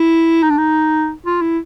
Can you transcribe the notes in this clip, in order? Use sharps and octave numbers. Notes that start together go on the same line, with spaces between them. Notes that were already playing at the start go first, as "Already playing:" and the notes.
Already playing: E4
D#4
D4
D#4
F4
E4